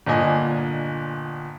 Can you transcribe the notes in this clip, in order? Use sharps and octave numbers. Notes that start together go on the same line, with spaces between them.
G1 A#2 D4 D#5 G#5